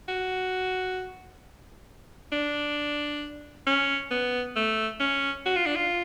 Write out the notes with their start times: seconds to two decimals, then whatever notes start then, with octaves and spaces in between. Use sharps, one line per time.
0.08 F#4
2.32 D4
3.67 C#4
4.11 B3
4.56 A3
5.00 C#4
5.46 F#4
5.56 F4
5.66 D4
5.76 F4